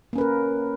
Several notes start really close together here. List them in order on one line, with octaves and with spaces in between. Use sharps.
A#3 C#4 B4 A#4